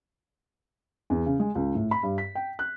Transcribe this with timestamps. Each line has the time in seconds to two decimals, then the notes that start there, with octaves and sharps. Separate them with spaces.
1.10 E2
1.26 C#3
1.40 G#3
1.55 C#2
1.75 A2
1.91 B5
2.03 G2
2.18 B6
2.35 G5
2.59 F#6